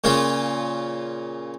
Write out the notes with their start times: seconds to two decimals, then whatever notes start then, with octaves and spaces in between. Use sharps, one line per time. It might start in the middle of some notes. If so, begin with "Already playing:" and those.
0.04 A#2 C#3 F4